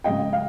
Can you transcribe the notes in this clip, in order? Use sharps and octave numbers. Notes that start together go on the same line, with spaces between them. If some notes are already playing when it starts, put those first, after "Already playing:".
C#3 G#3 D#5 G5
F5